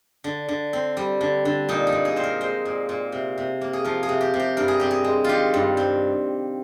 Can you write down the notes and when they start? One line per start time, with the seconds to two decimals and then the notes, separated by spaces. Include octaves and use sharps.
0.24 D3
0.48 D3
0.73 C4
0.97 G3
1.21 D3
1.45 D3
1.69 A#2 D#4
1.87 D#4
1.92 A#2
2.05 G#4
2.16 C4 C5
2.23 A#4
2.41 G#3 C5
2.65 A#2
2.89 A#2
3.12 C3
3.38 C3
3.61 A#3
3.73 G#4
3.84 F3 A#4
4.03 G#4
4.09 C3
4.21 G4
4.34 C3
4.40 G4
4.57 G2 A#4
4.68 G#4
4.80 C4 G4
4.91 G#4
5.04 G#3
5.24 D#3 F4 G4
5.54 G2
5.77 C4